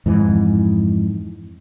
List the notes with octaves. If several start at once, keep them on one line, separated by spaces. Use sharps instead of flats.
F2 G#2 E3